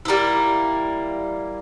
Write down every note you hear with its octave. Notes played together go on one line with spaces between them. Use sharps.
G3 A#3 E4